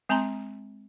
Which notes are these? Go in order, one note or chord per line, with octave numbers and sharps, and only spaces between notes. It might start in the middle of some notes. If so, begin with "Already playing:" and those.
G#3 C4 A5 A#5 C6